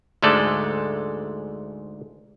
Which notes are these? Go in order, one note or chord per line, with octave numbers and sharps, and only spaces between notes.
D2 G#2 G#3 A3 A4 D5